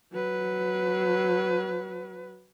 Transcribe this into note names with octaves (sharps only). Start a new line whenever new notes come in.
F#3 B4